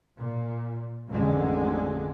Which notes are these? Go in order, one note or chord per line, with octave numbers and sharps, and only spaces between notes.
A#2
A1 F2 D3 G#3